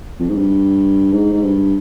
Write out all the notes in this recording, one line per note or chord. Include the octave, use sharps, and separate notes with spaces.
F2
G#2
G2
G#2
G#2
G2